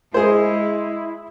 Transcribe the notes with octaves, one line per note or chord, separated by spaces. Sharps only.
G#3 E4 G#4 C5